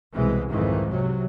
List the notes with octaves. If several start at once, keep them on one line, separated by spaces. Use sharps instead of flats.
C2 B2 E3 G#3
C2 F2 G#2 D#3 E3
C3 F#3